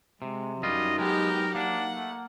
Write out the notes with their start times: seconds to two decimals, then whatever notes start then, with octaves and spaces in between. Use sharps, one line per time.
0.22 C3 G#3
0.63 F#2 F#3 G3 D#4 F4 D#5
0.98 G#3 B3 G4 A#4 G5
1.55 A#3 D4 F#5
1.95 A3